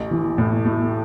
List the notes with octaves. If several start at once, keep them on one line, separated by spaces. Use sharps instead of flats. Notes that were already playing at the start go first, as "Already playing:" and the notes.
Already playing: A1
E3
A2
A3